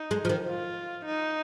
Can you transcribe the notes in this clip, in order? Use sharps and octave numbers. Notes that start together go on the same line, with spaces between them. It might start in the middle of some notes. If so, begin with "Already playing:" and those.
Already playing: D#4
G#3
F3
D#3
F4
D#4